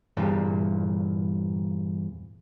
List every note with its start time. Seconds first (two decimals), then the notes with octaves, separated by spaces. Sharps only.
0.17 E2 G2 A#2